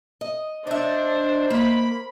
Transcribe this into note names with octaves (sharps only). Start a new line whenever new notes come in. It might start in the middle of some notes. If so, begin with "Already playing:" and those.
D#5
D4 D#4 C5 E5
A#3 B5